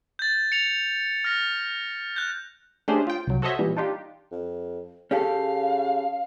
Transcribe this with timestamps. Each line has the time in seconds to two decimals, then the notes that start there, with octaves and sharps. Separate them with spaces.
0.19 G6 A6
0.52 C#7 F7
1.24 F6 A#6
2.16 F#6 G6
2.88 A3 C#4 D4 G4 G#4 C5
3.07 F4 G5
3.27 C2 F#3
3.42 F#4 A4 C5 C#5 D#5 E5
3.59 A#2 E3 G3
3.77 D4 D#4 F4 G4
4.32 F2
5.11 C#3 C#4 G4 A4 F5